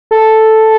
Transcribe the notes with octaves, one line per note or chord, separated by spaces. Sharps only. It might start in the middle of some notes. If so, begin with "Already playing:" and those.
A4